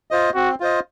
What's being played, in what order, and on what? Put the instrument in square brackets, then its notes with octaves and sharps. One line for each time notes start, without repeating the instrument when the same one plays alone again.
[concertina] F4 C5 D#5
[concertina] C4 [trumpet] F#4
[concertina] F4 C5 D#5